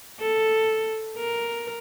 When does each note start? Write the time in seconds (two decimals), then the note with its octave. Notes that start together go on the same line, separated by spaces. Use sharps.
0.20 A4
1.18 A#4